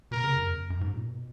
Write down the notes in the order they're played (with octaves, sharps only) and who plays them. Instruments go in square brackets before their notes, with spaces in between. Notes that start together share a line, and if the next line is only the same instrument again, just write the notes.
[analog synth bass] B2 [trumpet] A#4
[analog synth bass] C#3
F#2
E2
F#2
F#2
G#2
A#2
B2